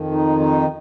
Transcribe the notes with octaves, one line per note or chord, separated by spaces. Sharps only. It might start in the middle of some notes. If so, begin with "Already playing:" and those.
Already playing: F2 D#3
D#4
D#4